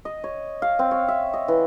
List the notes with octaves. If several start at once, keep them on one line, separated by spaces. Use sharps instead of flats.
D#5
C#5
F5
C4
C#5
E5
D#5
E3